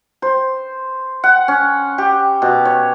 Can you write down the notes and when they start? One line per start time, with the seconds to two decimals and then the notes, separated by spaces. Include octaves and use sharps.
0.22 C5
1.24 F#5
1.48 C#4
1.98 G4
2.42 B2
2.65 C#5